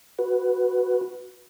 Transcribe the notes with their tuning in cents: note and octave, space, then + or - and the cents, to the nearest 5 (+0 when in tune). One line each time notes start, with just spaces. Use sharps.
F#4 +0 B4 +0